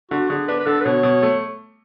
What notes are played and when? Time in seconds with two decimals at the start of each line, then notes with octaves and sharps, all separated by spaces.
0.11 D3 F#4
0.29 D3 G#4
0.48 D4 B4
0.59 B4
0.66 D3 A4
0.81 B4
0.85 B2 C#5
1.03 B2
1.23 A3